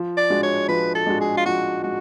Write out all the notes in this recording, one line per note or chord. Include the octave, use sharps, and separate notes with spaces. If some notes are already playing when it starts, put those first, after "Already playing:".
Already playing: F3
D5
G#3 D4 F#4
C#5
F3 B4
A4
G#3 D4 F#4
G#4
F4
F3 F#4
G#3 F#4